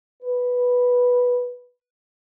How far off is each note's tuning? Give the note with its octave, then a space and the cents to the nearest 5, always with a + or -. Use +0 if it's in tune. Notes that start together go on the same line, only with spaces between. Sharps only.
B4 -5